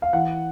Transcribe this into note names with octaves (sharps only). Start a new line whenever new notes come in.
F5
E3 F#5